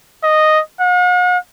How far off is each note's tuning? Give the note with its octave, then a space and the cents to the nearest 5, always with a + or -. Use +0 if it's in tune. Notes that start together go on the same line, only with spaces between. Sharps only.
D#5 -5
F#5 -45